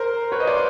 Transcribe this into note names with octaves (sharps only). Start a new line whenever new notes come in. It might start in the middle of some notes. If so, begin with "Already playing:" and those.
Already playing: A#4 C5
B4 C#5
D#5
C5 D5